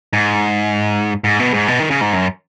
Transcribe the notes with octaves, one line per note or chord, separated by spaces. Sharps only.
G#2
G#2
B2
G#2
B2
D#3
C#3
G#2
F#2